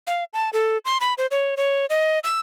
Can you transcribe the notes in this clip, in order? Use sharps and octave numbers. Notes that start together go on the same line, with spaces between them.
F5
A5
A4
C6
B5
C5
C#5
C#5
D#5
E6